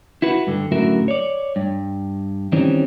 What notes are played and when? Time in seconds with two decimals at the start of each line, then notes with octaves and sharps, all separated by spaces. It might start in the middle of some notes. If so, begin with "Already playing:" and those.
0.22 E4 F#4 B4
0.47 G2 D3
0.72 F#2 A2 D3 F#4 A#4 E5
1.08 C#5 D5
1.56 G2
2.52 D#3 E3 G3 C4 C#4